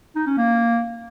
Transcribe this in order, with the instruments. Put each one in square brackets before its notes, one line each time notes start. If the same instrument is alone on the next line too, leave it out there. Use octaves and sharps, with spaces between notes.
[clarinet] D#4
C#4
A#3